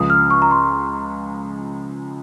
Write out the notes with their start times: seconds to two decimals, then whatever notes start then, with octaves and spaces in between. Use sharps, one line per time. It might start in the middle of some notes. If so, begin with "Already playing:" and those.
Already playing: C#2 C#3 F3 D#6
0.10 F6
0.30 C#6
0.42 A#5
0.51 C6